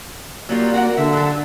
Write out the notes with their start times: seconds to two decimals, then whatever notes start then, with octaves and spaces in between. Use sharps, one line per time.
0.49 F#3 G3 A#3 F4
0.73 F#4 A#4 F#5
0.97 D3 E5
1.13 F#3 A4